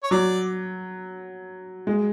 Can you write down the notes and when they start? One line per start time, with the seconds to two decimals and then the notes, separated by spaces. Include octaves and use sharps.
0.03 C#5
0.11 F#3 D5
1.87 G#3